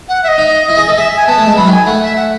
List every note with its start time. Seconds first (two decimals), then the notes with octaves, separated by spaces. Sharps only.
0.09 F#5
0.24 E5
0.28 D#5
0.38 D#4
0.69 E4
0.77 G#4
0.88 A4
0.98 G#4 E5
1.17 G#5
1.27 B3 A5
1.38 A3
1.47 G#3
1.57 F#3 B5
1.67 D#3
1.72 G#5
1.86 A3 F#5
2.02 E5
2.16 F#5